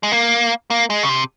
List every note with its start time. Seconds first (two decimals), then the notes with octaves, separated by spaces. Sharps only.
0.03 G#3
0.12 A#3
0.70 A#3
0.90 G#3
1.03 C#3
1.09 C3